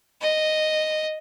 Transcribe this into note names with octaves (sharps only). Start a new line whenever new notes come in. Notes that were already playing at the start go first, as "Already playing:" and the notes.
D#5